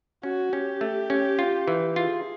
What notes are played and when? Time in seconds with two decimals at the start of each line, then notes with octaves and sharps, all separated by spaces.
0.23 C#4 F#4
0.53 C#4 G4
0.81 A3
1.10 C#4
1.39 F4
1.68 E3
1.96 F4 G#4